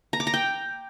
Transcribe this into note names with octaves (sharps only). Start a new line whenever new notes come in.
A#5
D6
A#5
G5